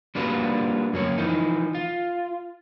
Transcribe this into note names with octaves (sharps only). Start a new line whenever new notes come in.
G3 A#3 D4 F4 F#4 B4
F#2 A#3 C#5
E3 F3 D#4
F4